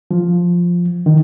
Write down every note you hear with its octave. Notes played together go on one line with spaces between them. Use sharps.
F3
D#3